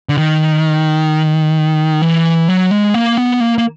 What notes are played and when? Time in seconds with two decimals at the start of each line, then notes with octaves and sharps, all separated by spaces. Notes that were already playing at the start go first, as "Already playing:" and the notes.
0.09 D3
0.18 D#3
2.02 E3
2.48 F#3
2.71 G#3
2.94 A#3
3.18 B3
3.40 A#3
3.58 A#3